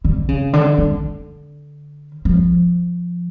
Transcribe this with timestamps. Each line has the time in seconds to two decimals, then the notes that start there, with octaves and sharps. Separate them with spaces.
0.05 D3
0.28 C#3
0.53 D3
0.78 D3
2.25 F3